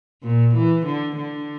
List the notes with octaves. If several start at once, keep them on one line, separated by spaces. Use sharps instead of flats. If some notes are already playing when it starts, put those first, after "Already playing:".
A#2
E3
D3
D3